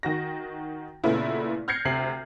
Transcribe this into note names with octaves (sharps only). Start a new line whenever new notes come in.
D#3 F#4 A#6
A#2 C#3 A3 B3 E4
F6 G6 G#6 A#6 C7 C#7
D2 C3 C7 F#7